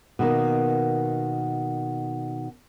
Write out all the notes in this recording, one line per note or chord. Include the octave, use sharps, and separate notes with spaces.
B2 D#3 A#3